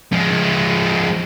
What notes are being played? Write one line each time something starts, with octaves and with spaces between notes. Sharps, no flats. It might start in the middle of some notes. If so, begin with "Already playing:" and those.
F3 G#3